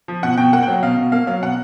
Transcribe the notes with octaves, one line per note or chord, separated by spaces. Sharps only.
F3
B2 F#5
B2 G5
A#3 F#5
G5
F#3
F#5
B2 F5
B2
A#3 F5
F#3 F5
B2 F#5